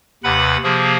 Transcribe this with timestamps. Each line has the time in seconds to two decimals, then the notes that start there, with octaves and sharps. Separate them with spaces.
0.24 D#2 C3 B4 F#5 B5
0.63 C3 F3 A#3 G#4